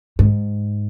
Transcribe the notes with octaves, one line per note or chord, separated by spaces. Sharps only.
G#2